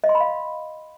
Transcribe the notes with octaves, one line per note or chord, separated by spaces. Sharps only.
D#5
C6
B5
F5